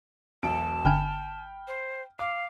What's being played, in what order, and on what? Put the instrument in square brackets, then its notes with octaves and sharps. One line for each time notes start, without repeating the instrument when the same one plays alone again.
[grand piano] E1 B1 D7 [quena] A5
[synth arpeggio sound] G1 D3 G#5 [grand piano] G5 B5 F6
[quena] C5
[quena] F5 [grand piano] D6